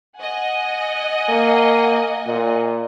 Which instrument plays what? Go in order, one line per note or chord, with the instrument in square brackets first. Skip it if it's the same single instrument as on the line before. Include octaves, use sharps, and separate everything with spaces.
[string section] D#5 F#5 G#5
[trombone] A#3
A#2